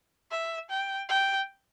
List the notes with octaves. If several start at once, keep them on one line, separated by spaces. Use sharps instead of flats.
E5
G5
G5